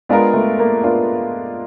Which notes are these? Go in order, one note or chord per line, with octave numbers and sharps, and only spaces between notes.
G#3 B3 D4 F4 A#4
A3
A#3
B3 D4 F4 A#4